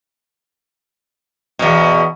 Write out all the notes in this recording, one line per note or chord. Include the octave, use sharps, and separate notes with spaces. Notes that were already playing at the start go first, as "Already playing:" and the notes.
E2 G#2 B2